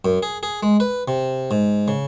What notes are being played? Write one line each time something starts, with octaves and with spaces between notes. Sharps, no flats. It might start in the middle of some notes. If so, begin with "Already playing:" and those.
F#2
G#4
G#4
G#3
B4
C3
G#2
C#3